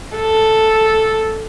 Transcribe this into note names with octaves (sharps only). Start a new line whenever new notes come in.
A4